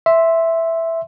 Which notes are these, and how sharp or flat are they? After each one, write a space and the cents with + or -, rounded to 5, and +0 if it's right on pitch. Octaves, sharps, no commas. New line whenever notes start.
E5 +0 C6 +0